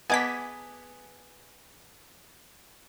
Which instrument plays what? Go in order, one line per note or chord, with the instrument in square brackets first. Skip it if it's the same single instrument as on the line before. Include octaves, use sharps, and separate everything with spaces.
[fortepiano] B3 D#5 A5 [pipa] G#4 [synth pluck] G#5 D6 B6